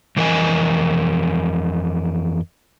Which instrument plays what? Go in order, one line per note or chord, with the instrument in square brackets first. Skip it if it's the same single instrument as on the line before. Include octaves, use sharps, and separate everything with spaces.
[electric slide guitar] F2 E3 A#4 D#5 G#5